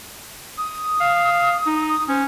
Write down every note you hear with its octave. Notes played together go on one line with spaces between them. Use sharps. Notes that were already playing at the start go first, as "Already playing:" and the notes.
D#6
F5
D#4
D#6
C#4 C5